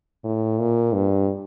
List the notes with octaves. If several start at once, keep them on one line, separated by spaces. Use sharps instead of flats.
A2
A#2
G2